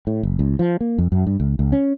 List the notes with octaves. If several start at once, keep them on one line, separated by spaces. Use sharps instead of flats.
A2
F#1
C#2
F3
A#3
F2
F#2
G2
C#2
C#2
C#4